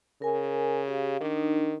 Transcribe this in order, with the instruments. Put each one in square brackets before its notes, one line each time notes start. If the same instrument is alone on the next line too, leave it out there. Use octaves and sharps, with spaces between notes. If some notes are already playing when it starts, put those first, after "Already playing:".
[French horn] C#3 [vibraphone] A#4 G#5
[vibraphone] G4 F5
[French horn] D#3 [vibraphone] D4 D#4